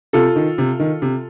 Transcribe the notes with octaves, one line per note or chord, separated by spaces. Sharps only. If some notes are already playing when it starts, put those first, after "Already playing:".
C3 F4 A4
D#3
C3
D#3
C3